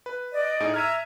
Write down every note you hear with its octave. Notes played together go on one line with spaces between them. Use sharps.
B4
D5 D#5
A2 D#4 G#4
E5 A#5 F6 G#6 D#7